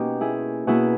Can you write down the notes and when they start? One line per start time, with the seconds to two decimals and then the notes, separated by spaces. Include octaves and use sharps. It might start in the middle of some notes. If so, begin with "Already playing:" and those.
Already playing: B2 A#3 C#4 D#4 G4
0.21 E4 G#4
0.67 B2 A#3 C#4 E4 G#4